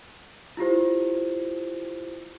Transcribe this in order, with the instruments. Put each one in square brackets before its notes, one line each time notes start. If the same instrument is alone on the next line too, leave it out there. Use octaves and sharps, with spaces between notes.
[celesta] E4 F4 G4 C5